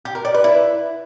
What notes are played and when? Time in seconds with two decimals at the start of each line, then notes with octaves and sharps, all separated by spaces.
0.05 G4
0.15 A#4
0.25 D5
0.34 B4
0.44 E4